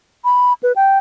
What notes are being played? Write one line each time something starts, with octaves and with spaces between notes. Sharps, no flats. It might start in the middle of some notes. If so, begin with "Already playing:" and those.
B5
B4
G5